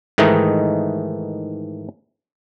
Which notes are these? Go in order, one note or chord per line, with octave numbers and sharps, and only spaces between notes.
G#2 D#3 E3 A3 D#4 D#5